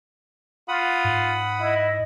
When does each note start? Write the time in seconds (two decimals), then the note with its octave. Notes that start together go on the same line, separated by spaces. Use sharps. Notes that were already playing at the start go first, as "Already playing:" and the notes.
0.68 F4 F#5 B5 D#6
1.04 G#2
1.60 E4 D#5